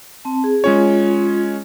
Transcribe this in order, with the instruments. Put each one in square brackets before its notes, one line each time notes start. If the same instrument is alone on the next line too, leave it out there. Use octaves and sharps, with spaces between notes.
[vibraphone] C4 A5
G#4
[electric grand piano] G#3 C#4 C#5 [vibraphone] F4